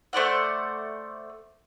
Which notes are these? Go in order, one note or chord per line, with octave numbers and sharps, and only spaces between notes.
A3 C5 D5 F#5